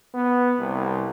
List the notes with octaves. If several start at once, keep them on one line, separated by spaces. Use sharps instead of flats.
B3
C2